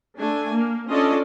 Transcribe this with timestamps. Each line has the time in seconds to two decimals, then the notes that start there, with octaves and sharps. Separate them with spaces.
0.16 A3 D4 G#5
0.51 A#3
0.88 C#4 D4 F4 A4 D5 D#5